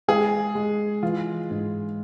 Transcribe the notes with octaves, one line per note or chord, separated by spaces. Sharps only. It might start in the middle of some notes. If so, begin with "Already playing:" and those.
G#3 G#4
G#3
E3 F4
G#2